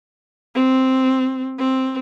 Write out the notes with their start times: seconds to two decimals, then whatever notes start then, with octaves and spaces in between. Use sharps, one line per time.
0.55 C4
1.59 C4